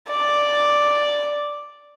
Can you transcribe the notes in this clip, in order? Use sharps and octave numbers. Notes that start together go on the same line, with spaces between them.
D5